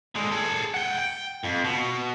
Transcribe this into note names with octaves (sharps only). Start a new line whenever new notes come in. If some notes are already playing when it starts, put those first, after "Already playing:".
D3 G#3
G#4 A4
F#5 G5
G5
F2
B2